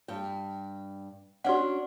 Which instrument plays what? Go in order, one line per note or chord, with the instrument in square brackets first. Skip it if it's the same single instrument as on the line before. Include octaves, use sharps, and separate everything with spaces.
[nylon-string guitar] G2 G5
[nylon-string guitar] C#4 D4 [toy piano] F#4 D5 F#5